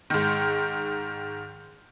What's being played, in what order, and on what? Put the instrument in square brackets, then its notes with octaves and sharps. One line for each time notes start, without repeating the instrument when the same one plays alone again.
[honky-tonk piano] G#2 D#3